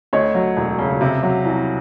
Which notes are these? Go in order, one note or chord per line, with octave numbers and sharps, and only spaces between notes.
D2 C#5 D#5
F#3
E1
C#3
C3
F#3
C2